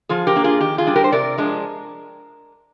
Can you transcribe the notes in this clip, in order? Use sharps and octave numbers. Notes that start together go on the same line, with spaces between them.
F3 F4 G#4
G4 A#4
A#3 D4
F4 G#4
D#3 G4
F4 G#4
G3 D4
G4 A#4
C5
C3 A#4 D5
F3 G#3 D4